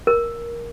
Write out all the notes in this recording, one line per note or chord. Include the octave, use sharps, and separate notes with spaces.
A#4